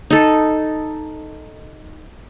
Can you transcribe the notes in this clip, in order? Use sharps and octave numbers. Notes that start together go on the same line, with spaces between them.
D#4 A4